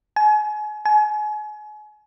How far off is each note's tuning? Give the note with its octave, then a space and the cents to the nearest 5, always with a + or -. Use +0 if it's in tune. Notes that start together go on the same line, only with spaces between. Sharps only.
G#5 +35
G#5 +35